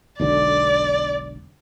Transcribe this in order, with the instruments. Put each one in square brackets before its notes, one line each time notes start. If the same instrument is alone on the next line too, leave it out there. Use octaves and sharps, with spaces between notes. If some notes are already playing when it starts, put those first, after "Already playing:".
[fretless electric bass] E1 B1 D3 [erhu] D5